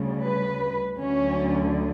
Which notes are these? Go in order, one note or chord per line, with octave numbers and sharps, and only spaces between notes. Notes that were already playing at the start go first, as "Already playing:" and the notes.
Already playing: D2 C#3 G3
B4
D2 D3 F#3 C#4